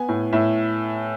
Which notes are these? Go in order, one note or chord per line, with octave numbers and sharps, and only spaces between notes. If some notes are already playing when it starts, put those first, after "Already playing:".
Already playing: B3 G#5
A2
A2 E5